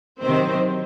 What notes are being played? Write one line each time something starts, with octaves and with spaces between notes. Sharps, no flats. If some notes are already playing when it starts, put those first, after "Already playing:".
C3 D#3 F#3 C4 C5